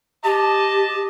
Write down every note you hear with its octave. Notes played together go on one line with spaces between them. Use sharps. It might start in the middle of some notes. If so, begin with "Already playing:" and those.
G4 D#5 A5